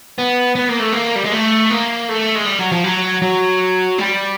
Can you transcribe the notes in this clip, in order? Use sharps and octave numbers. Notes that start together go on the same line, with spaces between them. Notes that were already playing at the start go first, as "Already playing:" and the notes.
B3
B3
A#3
A3
A#3
G3
G#3
A3
A#3
A3
G#3
G3
F#3
F3
F#3
F#3
G3